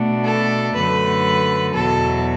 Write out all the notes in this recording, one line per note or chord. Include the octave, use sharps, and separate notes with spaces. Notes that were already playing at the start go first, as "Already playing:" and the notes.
Already playing: B2 A3 D4
A4
F#2 D3 A3 B4
E2 B2 F#3 A4